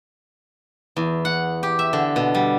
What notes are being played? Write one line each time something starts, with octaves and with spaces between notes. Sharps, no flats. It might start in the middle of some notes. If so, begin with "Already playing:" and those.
E2
F#5
G4
E5
D3
B2
G3